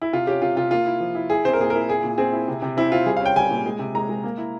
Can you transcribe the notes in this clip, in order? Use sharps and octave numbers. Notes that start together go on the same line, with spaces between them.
E4
C3 F4
C#4 G4
C3 F4
C3 F4
A#3 F4
E4
F3
E4
E4 G#4
C4 C5
A#4
A#2 G#4
E4 A#4
A#2 G#4
A#2
C4 G#4
E4
C3
C3
C4 E4
C4 F4
G3 G#4
F5
C#4
G5
G3 G#5
A#2
G#3
C3
G#3 A#5
G#3
A#3
E4